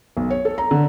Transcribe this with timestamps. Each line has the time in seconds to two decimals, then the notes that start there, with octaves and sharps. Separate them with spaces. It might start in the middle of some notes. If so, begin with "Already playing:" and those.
0.17 B1
0.30 C#5
0.45 A4
0.58 A#5
0.71 D3